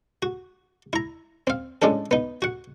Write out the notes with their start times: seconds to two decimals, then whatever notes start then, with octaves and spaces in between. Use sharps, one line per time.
0.23 F#4
0.93 E4 A#5
1.47 C4 F5
1.82 A2 G#3 C#4 D4 A4
2.11 B3 D#4
2.42 F#4 F#5